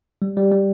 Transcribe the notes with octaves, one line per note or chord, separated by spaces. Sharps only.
G3
G3
G3